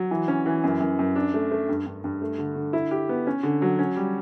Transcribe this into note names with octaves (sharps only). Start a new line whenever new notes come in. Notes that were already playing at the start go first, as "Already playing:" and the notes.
Already playing: F#3
E3
C#4
E3
F#2
F#2
F#2
D4
A3
A3
G2
G2
G2
A3
D3
D3
E4
G4
B3
C#4
D3
F#3
C#4
G3